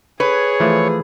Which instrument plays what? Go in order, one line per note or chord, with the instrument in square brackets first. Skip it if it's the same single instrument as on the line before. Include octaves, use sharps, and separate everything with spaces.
[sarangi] G#4 [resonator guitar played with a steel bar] B4 [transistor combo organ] C#5
[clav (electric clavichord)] E3 F3 A3